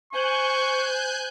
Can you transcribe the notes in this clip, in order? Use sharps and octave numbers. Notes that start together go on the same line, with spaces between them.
C5 G#5 C#6 F#6 G6